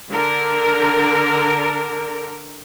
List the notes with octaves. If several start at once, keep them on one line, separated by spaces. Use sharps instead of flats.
D3 A#4